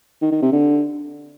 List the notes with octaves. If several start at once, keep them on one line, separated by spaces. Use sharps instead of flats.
D#3
D#3
C3
D3